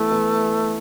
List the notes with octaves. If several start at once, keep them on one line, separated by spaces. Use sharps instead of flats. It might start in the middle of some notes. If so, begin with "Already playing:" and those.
Already playing: E3 A3 B3 E4
E3 B3 E4